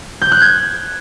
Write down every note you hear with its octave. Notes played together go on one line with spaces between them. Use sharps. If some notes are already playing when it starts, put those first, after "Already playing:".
G6
F#6
G#6